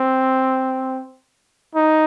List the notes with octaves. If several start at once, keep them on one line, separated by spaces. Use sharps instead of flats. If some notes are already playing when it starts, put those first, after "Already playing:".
Already playing: C4
D#4